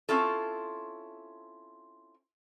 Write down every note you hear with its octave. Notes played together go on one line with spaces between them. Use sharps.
C4 C#4 E4 F4 A4